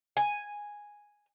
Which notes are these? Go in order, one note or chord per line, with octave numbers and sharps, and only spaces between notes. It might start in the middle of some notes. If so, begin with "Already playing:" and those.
G#5